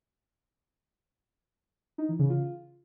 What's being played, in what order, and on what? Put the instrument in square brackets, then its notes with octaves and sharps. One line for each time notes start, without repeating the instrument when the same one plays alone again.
[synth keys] D#4
E3
C#3
F4